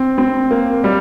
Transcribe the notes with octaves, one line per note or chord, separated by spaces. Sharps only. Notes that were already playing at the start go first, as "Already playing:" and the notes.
Already playing: C4
C4
A#3
G3